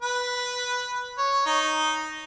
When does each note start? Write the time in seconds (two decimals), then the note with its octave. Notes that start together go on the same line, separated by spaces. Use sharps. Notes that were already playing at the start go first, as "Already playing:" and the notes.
0.02 B4
1.18 C#5
1.46 D#4